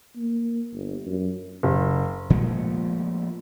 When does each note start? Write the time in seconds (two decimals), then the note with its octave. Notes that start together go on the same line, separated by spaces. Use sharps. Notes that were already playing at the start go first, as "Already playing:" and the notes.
0.17 A#3
0.73 G1
1.06 F#2
1.63 F#1
2.30 A#2 F3 G#3 A3